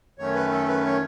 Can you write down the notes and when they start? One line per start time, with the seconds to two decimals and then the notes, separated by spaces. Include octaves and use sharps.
0.18 F#2 D#3 A3 C#4 C#5
0.34 B4
0.51 A4
0.68 B4
0.85 C#5